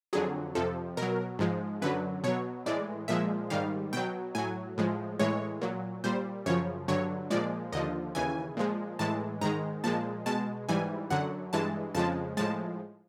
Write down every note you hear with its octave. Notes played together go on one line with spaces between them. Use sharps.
F2 D3 F#3 G#4
F2 C3 F3 A4
B2 F#3 A#4
G#2 F3 G#3
F#2 D3 F#3 B4
B2 F#3 C#5
A2 E3 G#3 D5
A#2 F3 G#3 E5
G#2 D#3 G3 F5
B2 F#3 G5
A2 F#3 G#5
A2 F3 G#3
A2 E3 G#3 C#5
A#2 F#3
A#2 G3 C5
F#2 C#3 F3 C#5
G2 D3 F#3 C#5
A#2 F3 G#3 D5
D#2 D3 F3 D#5
D#2 C#3 E3 G#5
A#2 F3 G#3
A2 E3 G#3 A5
G#2 D#3 G#3 A#5
A#2 F3 G#3 A5
B2 G#3 A5
G#2 E3 G3 G#5
F#2 D3 F#3 F#5
G2 E3 G#3 A5
F2 C#3 F3 G#3 A5
A2 F3 G#3 A5